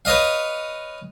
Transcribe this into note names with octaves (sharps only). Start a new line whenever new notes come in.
B4 C#5 D#5 F5